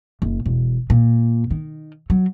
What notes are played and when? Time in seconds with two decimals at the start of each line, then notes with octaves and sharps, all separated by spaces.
0.22 F#1
0.46 E1
0.90 A#2
1.51 D#3
2.10 F#3